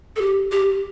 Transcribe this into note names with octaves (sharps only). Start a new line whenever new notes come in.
A4
G4
G4